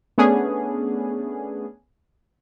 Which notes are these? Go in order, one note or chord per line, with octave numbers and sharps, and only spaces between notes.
A3 B3 C#4 D4 G#4